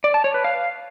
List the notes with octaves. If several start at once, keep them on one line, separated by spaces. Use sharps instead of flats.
D5
A5
C#5
B4
F5